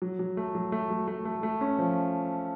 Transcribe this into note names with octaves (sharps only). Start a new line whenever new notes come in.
F#3
F#3
A3
F#3
A3
F#3
A3
A3
A3
C#4
F3